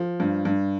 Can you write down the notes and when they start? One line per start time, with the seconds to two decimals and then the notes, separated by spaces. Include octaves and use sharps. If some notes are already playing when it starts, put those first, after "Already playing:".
Already playing: F3
0.20 G2
0.45 G2